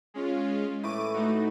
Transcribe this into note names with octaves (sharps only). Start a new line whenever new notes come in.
G#3 C#4 F4
A2 E3 C#6 D6 D#7
A3 D#4 F#4